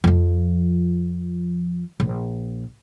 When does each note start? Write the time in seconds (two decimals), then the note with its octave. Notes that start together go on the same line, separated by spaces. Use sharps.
0.04 F2 F3
2.00 A#1